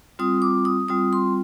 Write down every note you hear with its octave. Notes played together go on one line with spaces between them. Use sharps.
G3 C4 F4 D#6
D6
D#6
G3 C4 F4 D#6
C6